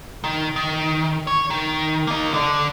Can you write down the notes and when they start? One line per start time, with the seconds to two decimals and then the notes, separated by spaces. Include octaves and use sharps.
0.24 D#3
0.56 D#3
1.27 C#5
1.50 D#3
2.07 A#3 D#5
2.34 D3 D4